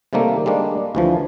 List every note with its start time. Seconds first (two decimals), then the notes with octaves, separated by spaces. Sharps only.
0.13 C3 D#3 G3 A3 A#3
0.46 G3 G#3 A#3 D4
0.95 D2 E3 F3